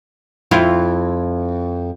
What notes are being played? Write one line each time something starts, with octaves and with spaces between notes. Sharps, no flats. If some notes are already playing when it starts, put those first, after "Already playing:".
F2 E4 F4